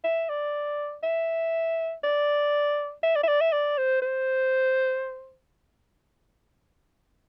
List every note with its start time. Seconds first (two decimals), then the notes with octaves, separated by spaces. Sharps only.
0.04 E5
0.29 D5
1.03 E5
2.03 D5
3.03 E5
3.16 D5
3.23 E5
3.28 D5
3.41 E5
3.52 D5
3.78 C5
4.02 C5